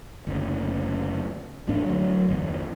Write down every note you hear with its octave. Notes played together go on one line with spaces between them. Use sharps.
F#1 D2
G#1 E2 A2 D4
D2 F#3
G1 E2